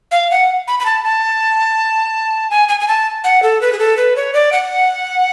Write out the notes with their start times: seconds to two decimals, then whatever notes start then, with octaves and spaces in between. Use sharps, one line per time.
0.11 F5
0.31 F#5
0.68 B5
0.80 B5
0.86 A5
1.04 A5
2.50 G#5
2.68 G#5
2.80 G#5
2.88 A5
3.24 F#5
3.43 A4
3.61 B4
3.73 G#4
3.79 A4
3.97 B4
4.16 C#5
4.34 D5
4.52 F#5